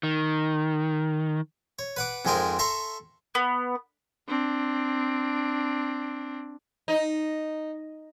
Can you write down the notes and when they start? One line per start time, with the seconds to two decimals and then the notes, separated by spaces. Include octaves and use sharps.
0.03 D#3
1.79 C#5
1.97 B4 F#5 D6
2.25 F2 G#2 G#3 C4 A#4 G#5
2.59 A4 E5 A#5 C6 C#6
3.35 B3
4.28 C4 D4
6.88 D#4